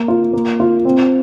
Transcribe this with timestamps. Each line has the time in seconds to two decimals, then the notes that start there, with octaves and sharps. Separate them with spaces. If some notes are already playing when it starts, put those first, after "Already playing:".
Already playing: A#3
0.08 F4
0.33 A#3
0.60 F4
0.85 C4